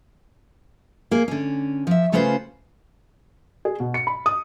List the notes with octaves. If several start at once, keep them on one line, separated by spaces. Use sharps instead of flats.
A#3 G#4
D3 C#4
F3 E5
C#3 A3 C#4 F4 B4 C5
G#4
B2
C#7
B5
D#6